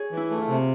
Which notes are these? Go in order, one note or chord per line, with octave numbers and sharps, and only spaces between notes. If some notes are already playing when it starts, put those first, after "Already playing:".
Already playing: G#4 C#5
E3
E4
A3
E4 F4
C3